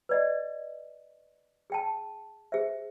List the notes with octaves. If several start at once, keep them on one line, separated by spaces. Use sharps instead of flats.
B4 D5 D#5
G#4 G5 A5
G#4 C5 E5